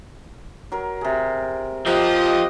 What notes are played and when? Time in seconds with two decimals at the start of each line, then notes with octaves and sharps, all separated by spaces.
0.72 F#3 A#4
1.01 C3 G#4
1.86 F3 F4 G4 A#4 C5 D#5 F#5 G5